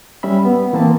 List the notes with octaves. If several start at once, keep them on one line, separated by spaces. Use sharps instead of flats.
G3 C#4 E5 B5
B3
E3 A#3 C4 A5